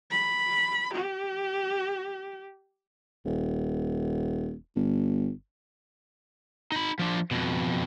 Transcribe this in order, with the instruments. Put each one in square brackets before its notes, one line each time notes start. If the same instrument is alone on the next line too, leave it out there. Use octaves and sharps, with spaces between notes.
[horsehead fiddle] B5
G4
[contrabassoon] D#1
G1
[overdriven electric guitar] D#4 B5
F3 D4
F2 B2